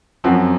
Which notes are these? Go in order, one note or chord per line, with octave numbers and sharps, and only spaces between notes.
F#2 F3 C4 F#4